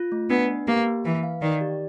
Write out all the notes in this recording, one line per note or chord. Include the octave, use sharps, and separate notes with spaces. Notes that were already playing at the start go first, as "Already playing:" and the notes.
Already playing: F4
A3
B3 D4
B4
A#3 G4
A#3
E3 B4
F5
D#3 D5
G4